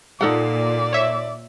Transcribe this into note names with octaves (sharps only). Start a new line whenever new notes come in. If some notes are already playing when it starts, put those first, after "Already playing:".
A#2 D#4 A4 D5 F#5
C#5 E5